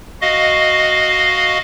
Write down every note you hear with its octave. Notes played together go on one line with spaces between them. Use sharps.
F#4 D#5 F5